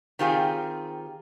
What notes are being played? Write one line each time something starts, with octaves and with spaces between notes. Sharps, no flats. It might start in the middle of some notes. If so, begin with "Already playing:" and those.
D#3 C4 F4 G4 G#4